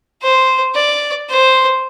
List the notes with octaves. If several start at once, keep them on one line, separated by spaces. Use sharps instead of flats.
C5
D5
C5